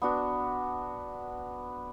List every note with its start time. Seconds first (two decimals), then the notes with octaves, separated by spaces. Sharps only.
0.02 B3 D4 F#4